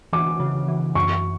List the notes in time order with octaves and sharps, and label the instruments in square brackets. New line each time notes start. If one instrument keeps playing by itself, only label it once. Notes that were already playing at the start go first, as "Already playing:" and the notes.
[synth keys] E3 [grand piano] D6
[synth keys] C#3
E3
[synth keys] F#2 [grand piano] C#6